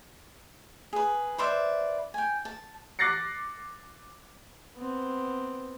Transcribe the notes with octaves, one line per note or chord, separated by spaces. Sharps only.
G#4 B4
B4 C5 D5 E5
G5 G#5
A5
D6 F#6 A6 A#6 C7 C#7
B3 C4